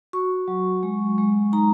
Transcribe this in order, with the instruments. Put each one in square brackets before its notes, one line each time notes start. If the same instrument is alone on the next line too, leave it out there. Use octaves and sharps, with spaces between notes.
[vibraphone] F#4 C#6
F#3
G#3
G#3
D#4 A#5